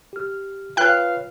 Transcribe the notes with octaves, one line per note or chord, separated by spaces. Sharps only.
G4 F6
F4 B4 C#5 F5 G5 F#6